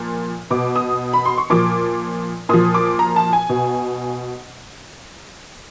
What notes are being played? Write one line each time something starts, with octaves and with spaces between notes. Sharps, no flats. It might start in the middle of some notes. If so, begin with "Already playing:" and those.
Already playing: A#2 F3
B2 D6
D#6
B5
C6
C#6
A#2 F3 D6
A#2 F3 D#6
D6
A#5
A5
G#5
B2